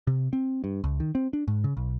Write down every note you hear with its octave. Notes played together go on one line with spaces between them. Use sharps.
C3
C4
G2
C#2
D#3
C4
D4
G#2
C#3
B1